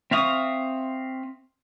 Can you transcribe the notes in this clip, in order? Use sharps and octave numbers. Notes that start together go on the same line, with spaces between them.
C4 E5 F5 C#6 D#6